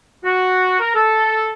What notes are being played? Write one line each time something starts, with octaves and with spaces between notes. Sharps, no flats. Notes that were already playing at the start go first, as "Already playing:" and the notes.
F#4
A#4
A4